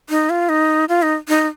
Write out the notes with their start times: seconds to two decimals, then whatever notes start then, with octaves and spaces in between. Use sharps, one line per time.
0.10 D#4
0.30 F4
0.49 D#4
0.89 F4
1.02 D#4
1.29 D#4